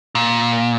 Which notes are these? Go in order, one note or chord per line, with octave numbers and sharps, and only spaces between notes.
A#2